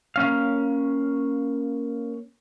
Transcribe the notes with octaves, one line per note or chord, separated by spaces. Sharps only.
A#3 C#4 F5